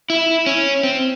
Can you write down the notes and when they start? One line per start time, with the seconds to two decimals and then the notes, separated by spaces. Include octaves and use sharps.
0.10 E4
0.46 C#4
0.83 C4